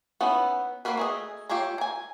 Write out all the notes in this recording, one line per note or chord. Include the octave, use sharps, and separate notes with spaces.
B3 C#4 D#4 E4
A#3 C4 F#4 A#4 B4
A3 G#4 D#5
F4 G4 A4 C#5 A#5
G#5 A#5